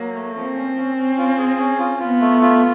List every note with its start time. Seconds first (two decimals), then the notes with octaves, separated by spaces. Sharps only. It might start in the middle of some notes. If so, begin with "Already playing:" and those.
Already playing: F#3 A#3
0.15 A3
0.35 F3 C4
0.55 C#4
0.77 C#4
0.97 C#4
1.18 F4
1.38 G#4
1.58 C#4
1.79 F4
2.00 B3 F4
2.21 A3
2.42 F4